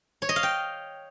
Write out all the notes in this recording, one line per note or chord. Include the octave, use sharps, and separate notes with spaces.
C#5
D#5
F5
G5